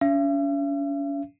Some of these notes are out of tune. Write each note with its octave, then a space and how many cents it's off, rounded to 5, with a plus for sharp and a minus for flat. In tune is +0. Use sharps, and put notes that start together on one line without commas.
C#4 +40 E5 +45